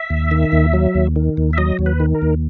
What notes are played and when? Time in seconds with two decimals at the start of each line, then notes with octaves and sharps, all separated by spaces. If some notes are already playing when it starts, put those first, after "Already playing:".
Already playing: E5
0.10 D#2
0.31 D#3
0.52 D#2
0.73 F#3
0.95 D#2
1.16 D#3
1.37 D#2
1.53 E5
1.57 F#3 D#5
1.79 D#2
1.86 B4
2.00 D#3
2.15 A#4
2.22 D#2